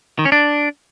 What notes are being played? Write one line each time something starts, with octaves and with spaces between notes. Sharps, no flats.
D#3
C#4
D4